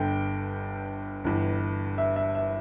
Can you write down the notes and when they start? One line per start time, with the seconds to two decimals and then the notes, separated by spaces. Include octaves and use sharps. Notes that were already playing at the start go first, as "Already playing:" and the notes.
Already playing: G1 G2 D3 G5
1.24 G1 G2 E3
1.98 E5
2.16 E5
2.35 E5